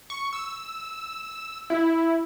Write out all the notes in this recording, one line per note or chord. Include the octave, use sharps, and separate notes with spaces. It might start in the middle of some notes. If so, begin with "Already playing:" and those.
C#6
E6
E4